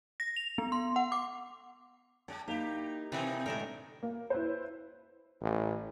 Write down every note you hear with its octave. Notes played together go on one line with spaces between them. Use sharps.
A#6
F7
B3
C6
F#5
D6
G#3 D4 G5
A#3 D#4 E4 G4
B2 E3 C4 D#4 B4
A2 D3 G#3 A3 A4 A#4
A#3
E4 B4 C5
A1